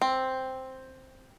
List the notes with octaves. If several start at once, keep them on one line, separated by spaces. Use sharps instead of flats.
C4